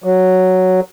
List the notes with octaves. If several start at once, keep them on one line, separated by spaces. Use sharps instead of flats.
F#3